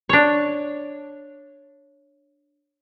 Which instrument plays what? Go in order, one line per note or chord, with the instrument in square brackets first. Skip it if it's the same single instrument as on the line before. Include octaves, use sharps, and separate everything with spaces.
[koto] D4 C#5